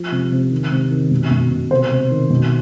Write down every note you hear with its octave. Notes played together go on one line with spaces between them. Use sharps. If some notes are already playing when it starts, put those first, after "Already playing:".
Already playing: F3
C3
C3
D#3
C3
D#3
B2
B2
B2
C3 C5
C3
D#3
B2